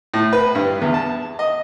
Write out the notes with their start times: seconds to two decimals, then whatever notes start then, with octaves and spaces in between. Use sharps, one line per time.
0.14 A2
0.33 B4
0.55 G2
0.81 E2
0.94 A5
1.39 D#5